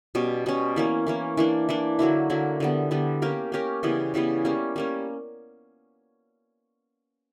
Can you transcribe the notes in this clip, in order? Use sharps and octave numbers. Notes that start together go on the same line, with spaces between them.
B2 G3 C#4
B2 G3 C#4
E3 A#3 C#4
E3 A#3 C#4
E3 A#3 D4
E3 A#3 D4
D3 F#3 A#3 E4
D3 F#3 A#3 E4
D3 G3 B3
D3 G3 B3
A#3 C#4 G4 A#4
A#3 C#4 G4 A#4
C#3 E3 G3 B3
C#3 E3 G3 B3
G3 A#3 C#4
G3 A#3 C#4